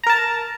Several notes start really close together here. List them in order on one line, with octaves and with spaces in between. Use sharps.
A#5 A#4 A5